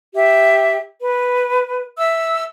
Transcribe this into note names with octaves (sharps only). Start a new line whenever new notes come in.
G4 E5
B4
E5 E6